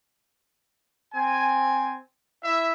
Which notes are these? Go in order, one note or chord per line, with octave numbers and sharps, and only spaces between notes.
C4 G#5
E4 E5